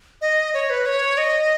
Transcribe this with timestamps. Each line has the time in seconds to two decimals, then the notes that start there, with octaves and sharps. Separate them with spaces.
0.21 D#5
0.54 C#5
0.70 B4
0.86 C#5
1.18 D#5